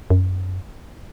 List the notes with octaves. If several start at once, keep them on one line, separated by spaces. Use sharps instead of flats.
F#2